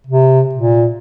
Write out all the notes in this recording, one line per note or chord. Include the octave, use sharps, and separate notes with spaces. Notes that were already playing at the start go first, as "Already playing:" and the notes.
C3
A#2